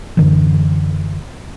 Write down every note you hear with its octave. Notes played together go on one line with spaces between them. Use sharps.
F#2 D3 E3